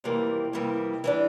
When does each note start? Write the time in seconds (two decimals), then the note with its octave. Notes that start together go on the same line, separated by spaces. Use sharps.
0.04 F2 C3 E3 G3 A#3
0.53 F2 C3 E3 G3 A#3
1.04 E3 G3 D4